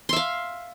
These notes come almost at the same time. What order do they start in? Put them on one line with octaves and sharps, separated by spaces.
C6 E5 F5